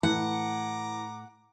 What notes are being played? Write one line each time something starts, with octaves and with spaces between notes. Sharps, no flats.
A2 E3 F#5 A#5 D6